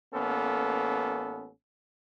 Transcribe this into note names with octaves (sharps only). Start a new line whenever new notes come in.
A1 A#3 B3 C#4 A4